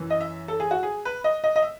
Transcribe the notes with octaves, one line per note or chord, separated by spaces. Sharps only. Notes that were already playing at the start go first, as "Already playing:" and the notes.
Already playing: F#2 E3
D#5
E5
A4
G#4
F#4
G#4
B4
D#5
D#5
D#5
E5